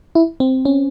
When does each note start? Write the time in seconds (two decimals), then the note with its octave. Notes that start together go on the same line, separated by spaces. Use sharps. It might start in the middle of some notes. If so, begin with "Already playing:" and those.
0.15 E4
0.40 C4
0.65 C#4